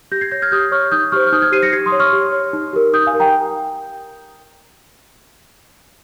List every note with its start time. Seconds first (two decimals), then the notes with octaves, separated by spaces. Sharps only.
0.12 G4 G6 A#6
0.21 G#6 C7
0.31 C#5 G6 A#6
0.42 F6 G#6
0.51 G4 D#6 G6
0.72 C#5 C#6 F6
0.92 D#4 D#6 G6
1.12 G4 C5 C#6 F6
1.27 F6
1.32 D#4 D#6 G6
1.42 F6 G#6
1.52 G4 C5 C7 D#7
1.63 A#6 C#7
1.72 G4 G#6 C7
1.86 C6 D#6
1.92 C#5
2.00 C#6 F6
2.13 G4
2.32 C#5
2.53 D#4
2.73 G4 A#4
2.93 D#4 D#6 G6
3.07 F5 G#5
3.13 G4 A#4
3.20 G5 A#5